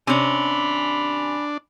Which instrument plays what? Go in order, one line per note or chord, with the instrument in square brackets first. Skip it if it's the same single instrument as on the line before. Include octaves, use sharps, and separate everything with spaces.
[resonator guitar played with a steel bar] C3 C#4 [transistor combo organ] D4 [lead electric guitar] G#5 B5